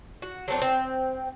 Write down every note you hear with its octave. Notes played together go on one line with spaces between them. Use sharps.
F#4
F#3 A3 C4 D4
C4